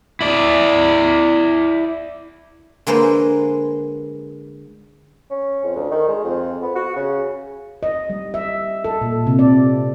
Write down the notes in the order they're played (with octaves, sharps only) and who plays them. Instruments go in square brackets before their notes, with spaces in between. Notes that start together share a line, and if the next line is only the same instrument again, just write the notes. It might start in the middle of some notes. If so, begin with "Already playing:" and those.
[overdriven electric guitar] E4 D5
[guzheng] D3 G#3 A#3 B4 C5
[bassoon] C#4
F2
D2
D#3
G#3
F2
B3
F#4
C#3
[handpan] D#5
G3
E5
A4
A#2
C3
D5